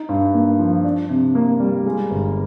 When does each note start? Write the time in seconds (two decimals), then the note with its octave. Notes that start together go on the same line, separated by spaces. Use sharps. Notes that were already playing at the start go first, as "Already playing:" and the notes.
Already playing: D#4
0.09 G2
0.34 A#3
0.59 F3
0.84 D4
1.10 C3
1.35 A#3
1.60 G3
1.86 G#3
2.11 G1